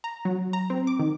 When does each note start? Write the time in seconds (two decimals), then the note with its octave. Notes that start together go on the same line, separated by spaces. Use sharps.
0.04 A#5
0.25 F#3
0.53 A#5
0.70 C4
0.87 D6
0.99 D#3